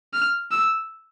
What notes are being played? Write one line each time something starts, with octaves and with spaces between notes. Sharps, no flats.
F6
E6